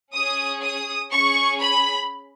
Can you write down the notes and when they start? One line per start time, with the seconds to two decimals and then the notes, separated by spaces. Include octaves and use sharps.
0.13 C#4 G#4 D#6
0.62 D#6
1.11 C#4 G#4 C#6
1.61 B5